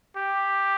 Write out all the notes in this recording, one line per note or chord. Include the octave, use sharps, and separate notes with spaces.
G4